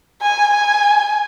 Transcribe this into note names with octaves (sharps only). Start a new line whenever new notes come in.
G#5
G#5